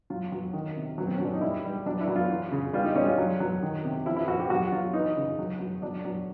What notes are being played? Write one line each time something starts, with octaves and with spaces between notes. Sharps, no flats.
F#3 F4
F#3
D#3
C3
F#3
C4
C#4
F#3 D4
D#4
G3 E4
G3
F#3 D4
E4
F#3
F4
E3
C#3
G3 F4
D#4
G3 C#4
F4
F#3
F#3
D#3
C3
F3 E4
E4
F3 F#4
G4
F#3 F#4
F#3 F4
E3 D#4
C#3
F#3
F#3
F#3 D4
F#3